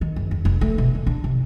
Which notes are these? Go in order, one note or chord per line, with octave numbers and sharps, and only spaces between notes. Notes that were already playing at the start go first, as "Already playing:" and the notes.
D#3
F#1
F2
F1
A3
B2
D3
D4
C3